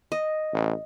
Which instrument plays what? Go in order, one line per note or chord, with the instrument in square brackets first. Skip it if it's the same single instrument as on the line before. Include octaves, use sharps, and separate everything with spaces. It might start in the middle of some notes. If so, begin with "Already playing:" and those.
[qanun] D#5
[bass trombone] A1